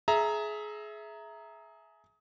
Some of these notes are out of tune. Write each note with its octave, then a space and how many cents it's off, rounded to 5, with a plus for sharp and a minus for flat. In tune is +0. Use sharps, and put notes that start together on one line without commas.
G#4 +25 E5 +0 A#5 -5